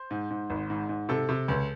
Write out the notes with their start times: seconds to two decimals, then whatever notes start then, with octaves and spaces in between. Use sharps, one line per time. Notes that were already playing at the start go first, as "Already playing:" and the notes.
Already playing: C5
0.11 G#2
0.30 G#2
0.50 G#1
0.70 G#2
0.89 G#2
1.09 C3 A4
1.29 C3
1.48 C#2